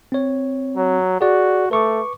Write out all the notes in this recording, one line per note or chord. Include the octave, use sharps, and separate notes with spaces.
C4 C#5
F#3
F#4 G#4 D5
A3 B4 C#6 D6